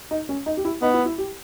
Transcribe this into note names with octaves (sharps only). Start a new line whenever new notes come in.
D#4
C#4
D#4
G4
E4
B3 D#4
E4
E4
G4